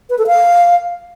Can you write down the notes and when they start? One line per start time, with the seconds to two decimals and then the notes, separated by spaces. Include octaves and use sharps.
0.10 B4
0.18 A4
0.27 F5